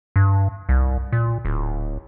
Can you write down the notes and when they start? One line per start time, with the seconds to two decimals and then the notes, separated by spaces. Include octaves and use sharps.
0.16 G2
0.69 C2
1.12 A#2
1.45 D1